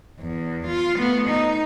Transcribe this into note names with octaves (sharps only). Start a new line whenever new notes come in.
E2
F4
A3 B3
D#4